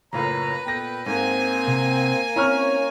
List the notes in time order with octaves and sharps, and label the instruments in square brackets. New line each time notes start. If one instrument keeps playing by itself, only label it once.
[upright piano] F#1 A2 F4 [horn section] A#4 C#5 A#5 [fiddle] B4
[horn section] A#2 A4 G5 [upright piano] B3 A#6
[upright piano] G#2 [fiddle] A#3 G#5 [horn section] C4
[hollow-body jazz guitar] C3
[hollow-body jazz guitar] C4 E4 [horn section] C#4 [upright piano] A#5 C#6 F6